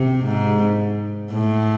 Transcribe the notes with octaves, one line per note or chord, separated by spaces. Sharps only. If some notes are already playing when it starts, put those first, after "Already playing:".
Already playing: C3
G#2
A2